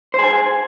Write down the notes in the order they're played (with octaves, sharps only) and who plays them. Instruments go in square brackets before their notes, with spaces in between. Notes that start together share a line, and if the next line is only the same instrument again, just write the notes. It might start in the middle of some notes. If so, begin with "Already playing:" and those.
[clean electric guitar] C5
G#4
G#5